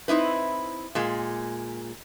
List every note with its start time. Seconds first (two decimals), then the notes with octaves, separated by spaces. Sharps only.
0.08 C4 D#4 E4 B4
0.95 A#2 G#3